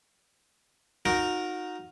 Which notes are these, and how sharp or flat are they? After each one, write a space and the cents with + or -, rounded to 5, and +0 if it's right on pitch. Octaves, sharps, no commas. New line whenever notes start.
D#4 +0 F#4 -30 A#4 +0